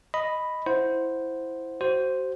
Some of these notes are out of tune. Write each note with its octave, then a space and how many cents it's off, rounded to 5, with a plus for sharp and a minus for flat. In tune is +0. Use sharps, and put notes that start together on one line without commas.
D#5 +0 B5 +0
E4 +0 C5 +0 F#5 +0
F#4 +35 C5 +0